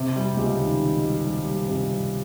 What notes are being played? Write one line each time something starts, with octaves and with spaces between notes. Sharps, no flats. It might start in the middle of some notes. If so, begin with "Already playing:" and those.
Already playing: C3
G3
C#2
D#3
D#3
G3
G3
G3
C3
G3